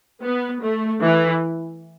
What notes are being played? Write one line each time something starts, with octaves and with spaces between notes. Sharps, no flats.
B3
A3
E3